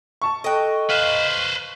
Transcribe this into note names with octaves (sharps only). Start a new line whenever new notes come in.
A5 C#6
A4 D#5 G5 F#6
B4 C5 F5 F6